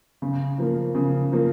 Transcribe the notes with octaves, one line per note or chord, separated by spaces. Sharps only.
C#3
F3 A#3
C#3
F3 A#3